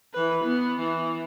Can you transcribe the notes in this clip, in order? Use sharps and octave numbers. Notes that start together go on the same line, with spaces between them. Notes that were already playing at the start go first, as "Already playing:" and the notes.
E3 B4
B3
E3